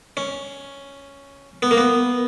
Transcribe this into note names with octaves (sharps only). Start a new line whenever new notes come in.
C#4
B3
A#3
B3